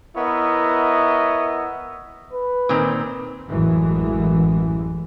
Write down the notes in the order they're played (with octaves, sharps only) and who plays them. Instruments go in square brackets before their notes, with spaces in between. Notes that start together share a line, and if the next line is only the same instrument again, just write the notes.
[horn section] B3 E4 A#4 C#5 D#5 E5
[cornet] B4
[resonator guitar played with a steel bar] A#2 D#3 C4
[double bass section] A1 F#2 E3 G#3